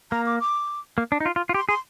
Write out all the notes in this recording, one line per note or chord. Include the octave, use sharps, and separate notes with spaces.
A#3 A#5
D6
D6
A#3
D4
D#4
F4
F4
F4
G4 C6
G#4 C6